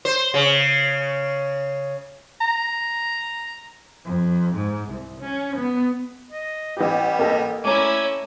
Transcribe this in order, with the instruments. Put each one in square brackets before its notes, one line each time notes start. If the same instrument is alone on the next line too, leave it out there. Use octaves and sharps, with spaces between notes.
[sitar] C5
C#3
[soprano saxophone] A#5
[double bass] F2
G#2
C2
C#4
B3
[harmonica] D#5
[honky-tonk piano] A1 G4 [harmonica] G3 B3
[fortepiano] A#3 A4 D#5
[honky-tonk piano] A3 A#5 [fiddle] C#4 E4 [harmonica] D5 G#5